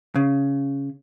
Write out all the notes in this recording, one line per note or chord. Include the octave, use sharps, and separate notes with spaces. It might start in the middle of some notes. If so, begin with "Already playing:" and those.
C#3